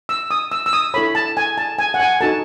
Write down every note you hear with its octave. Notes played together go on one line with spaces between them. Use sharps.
E6
D#6
E6
E6
D#6
E4 A4 C#5 B5
A5
G#5
A5
G#5
F#5
G#5
D#4 F#4 A4 A5